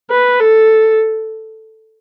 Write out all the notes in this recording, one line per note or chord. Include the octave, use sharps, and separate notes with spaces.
B4
A4